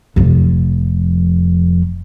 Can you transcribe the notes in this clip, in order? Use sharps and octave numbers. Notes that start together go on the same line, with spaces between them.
F1 F3